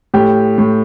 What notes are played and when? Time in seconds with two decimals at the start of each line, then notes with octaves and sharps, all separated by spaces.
0.14 A2 G4
0.58 A2